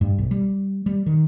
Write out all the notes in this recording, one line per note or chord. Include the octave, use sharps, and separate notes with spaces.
G2
B1
G3
G3
D#3